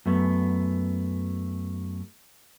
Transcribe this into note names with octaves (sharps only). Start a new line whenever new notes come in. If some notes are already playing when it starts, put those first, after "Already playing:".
F#2 A3 B3